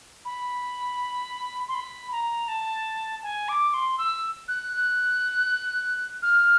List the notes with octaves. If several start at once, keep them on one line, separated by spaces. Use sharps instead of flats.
B5
C6
B5
A#5
A5
G#5
D6
C6
E6
F#6
F#6
F6